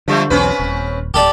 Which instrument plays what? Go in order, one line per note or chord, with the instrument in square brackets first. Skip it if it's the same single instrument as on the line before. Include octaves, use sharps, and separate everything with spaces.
[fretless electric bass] D3 [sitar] F3 G3 A3
[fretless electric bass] B1 E2 [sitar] C4 C#4 B4
[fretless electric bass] D#1
[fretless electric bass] D1 [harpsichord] G4 A4 D5